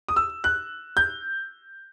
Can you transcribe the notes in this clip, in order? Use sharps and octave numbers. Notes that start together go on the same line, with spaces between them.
D#6
E6
F#6
G6